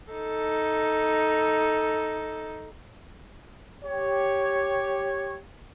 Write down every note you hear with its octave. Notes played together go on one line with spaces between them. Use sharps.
D#4 A4
G4 C#5